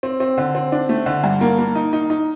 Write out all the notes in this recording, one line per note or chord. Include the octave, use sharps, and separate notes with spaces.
C4
C4
D3
C4
D4
A3
D3
G2
A#3
A#3
D#4
D#4
D#4